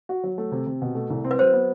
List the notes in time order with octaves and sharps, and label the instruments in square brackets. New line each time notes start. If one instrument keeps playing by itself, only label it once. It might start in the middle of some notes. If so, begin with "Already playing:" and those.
[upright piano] F#4
F#3
A3
C3
C3
B2
A3
C2
C4
[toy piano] B4
[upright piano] F#3 [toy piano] C5
[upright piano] B3